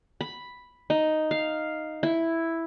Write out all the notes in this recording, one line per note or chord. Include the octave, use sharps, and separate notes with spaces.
B5
D#4
F5
E4